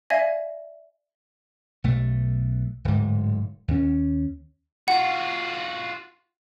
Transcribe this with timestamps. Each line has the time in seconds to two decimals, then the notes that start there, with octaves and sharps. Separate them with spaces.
0.10 D5 E5 F5 G#5 G#6 A#6
1.84 B1 A3
2.85 D1 D2 G#2
3.68 D#2 C#4
4.88 F4 F#4 F#5